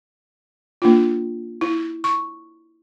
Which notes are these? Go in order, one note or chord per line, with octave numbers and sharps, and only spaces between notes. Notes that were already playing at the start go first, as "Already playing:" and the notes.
A#3 D4 F4
E4
C#6